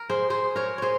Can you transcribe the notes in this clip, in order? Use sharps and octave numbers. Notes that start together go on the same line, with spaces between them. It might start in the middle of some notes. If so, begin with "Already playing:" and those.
Already playing: A#4
G#4 C5
G#4 C5
A#4 C#5
G#4 C5 C#5